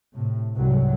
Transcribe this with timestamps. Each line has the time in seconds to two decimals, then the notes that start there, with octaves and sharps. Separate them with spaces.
0.16 A2 C3
0.54 C2 G#2 F#3